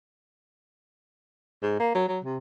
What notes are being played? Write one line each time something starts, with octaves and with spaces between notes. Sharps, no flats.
G#2
A#3
F#3
F#3
C3